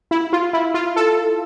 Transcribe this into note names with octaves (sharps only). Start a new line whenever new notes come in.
E4
F4
E4
F4
A4